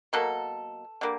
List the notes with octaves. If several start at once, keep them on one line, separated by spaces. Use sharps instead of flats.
B2 F#3 A#3 A4
D3 G3 A#3